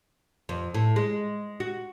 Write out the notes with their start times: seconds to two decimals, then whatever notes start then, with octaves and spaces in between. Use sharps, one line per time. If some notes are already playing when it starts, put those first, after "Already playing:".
0.49 F2
0.74 A2
0.96 G#3
1.60 F#4